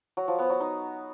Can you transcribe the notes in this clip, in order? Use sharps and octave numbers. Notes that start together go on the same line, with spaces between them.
F#3
F3
B3
F#3
D#4